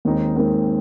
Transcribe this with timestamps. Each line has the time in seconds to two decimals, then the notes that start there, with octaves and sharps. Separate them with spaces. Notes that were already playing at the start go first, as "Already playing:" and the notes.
0.05 D#2 D#3 G#3 C4 D#4
0.36 D#2 D#3 G#3 C4 D#4